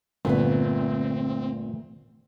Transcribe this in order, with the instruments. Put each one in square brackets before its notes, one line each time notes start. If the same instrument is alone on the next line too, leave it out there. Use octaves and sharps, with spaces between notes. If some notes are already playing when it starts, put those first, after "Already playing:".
[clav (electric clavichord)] G1 A#2 D3 [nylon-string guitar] D2 A3 B3 [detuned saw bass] C4